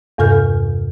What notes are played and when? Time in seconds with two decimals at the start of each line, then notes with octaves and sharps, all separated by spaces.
0.18 E2 G2 C3 A4 F6 G6